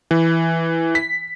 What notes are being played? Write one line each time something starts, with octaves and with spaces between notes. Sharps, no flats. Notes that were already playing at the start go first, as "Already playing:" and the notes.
E3
B6